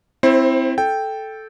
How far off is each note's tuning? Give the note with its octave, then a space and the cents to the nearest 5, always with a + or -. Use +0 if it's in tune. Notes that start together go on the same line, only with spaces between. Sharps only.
C4 +0 E4 +0 C5 +30
A4 -10 G5 +0